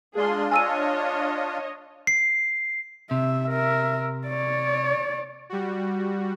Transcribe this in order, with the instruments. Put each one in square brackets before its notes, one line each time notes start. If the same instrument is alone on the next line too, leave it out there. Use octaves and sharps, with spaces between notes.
[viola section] G#3 G#4 C6 [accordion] D4 F4
[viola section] C#5 D#5 [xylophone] G#5 E6 D#7
[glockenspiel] C7
[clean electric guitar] C3 [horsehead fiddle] E5
[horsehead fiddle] A#4 E5
C#5 D5
[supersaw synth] G3 F#4